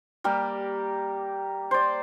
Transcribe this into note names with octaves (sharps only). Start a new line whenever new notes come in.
G3 A#3 G4
C5 D5